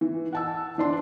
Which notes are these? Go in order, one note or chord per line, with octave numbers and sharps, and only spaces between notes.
E3
F#5 A5 E6
E3 D4 C6